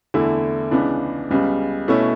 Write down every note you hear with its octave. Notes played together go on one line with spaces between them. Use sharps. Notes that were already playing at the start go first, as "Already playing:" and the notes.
E2 D3 A3 E4
C#2 C#3 E3 B3 D4
C#2 C#3 G3 B3
B2 A3 C#4 E4